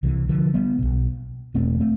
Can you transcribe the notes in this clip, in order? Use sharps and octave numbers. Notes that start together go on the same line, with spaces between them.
C2 C3 E3
D3 F3
G3 B3
B1 B2
E1 E2 B2 A3 C4
A3 C4